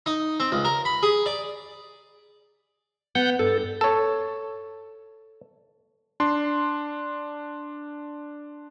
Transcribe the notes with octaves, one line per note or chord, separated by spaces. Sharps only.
D#4
C4
C#2
A#4
B5
G#4
D5
B3 F#5 G6
G2 A4
A4 C#5
D4 C6